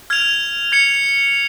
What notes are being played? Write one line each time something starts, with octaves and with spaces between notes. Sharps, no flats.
F6 G#6 F7
G#6 C#7 F7